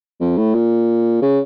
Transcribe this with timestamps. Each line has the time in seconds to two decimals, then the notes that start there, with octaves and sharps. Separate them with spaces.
0.21 F2
0.37 A2
0.55 A#2
1.22 C#3